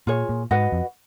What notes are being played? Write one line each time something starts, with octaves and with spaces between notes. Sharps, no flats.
A#2 F4 G#4 C#5
A#2
G#2 F#4 B4 D#5 F#5
F2